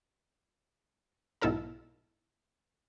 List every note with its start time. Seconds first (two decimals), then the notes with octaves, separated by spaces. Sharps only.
1.42 B1 G#2 E4 A4 A#4 A#5